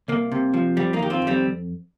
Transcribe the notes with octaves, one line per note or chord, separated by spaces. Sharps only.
C2 A#3
C3
F3
F2 G3 C4
A#3 D#4
D#3 G4
C4 F4
F2
G3 C4